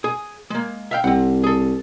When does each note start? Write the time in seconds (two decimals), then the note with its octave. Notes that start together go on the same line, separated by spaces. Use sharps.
0.04 G#4
0.50 G#3 A#3
0.91 E5 F5 G5
1.04 C2 C4 F#5
1.44 G#4 A4